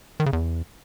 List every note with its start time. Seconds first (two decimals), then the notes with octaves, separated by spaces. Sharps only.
0.20 D#3
0.26 C#3
0.33 E2